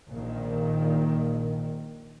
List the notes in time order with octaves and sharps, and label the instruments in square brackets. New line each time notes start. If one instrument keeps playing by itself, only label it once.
[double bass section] A#1 A#2 D#3